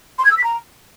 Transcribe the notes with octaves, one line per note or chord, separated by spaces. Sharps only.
C6
G#6
E6
B6
A#5